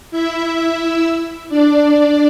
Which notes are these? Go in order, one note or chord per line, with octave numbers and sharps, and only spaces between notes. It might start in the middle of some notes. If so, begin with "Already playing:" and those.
E4 E5
D4 D5